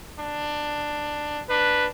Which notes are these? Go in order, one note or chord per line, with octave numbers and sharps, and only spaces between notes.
D4
D4 B4